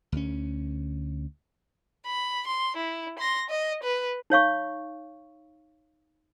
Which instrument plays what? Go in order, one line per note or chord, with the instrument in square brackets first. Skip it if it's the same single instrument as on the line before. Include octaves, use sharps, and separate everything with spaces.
[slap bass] D2 C#4
[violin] B5
C6
E4
C6 A#6
D#5
B4
[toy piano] D#4 C#5 F5 C#6